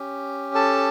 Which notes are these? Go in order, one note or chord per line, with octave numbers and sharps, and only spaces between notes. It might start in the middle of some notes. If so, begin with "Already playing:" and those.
Already playing: C#4 G4
A4 A5